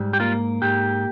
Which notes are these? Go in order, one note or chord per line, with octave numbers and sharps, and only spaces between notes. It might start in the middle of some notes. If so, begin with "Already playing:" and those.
Already playing: G#2 G3
G4
A#3 F4
G#2 G4